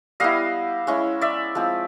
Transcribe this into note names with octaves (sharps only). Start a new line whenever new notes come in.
G3 B3 E4 D#5 F5
G#3 C#4 E4
D5 E5
F3 G#3 C4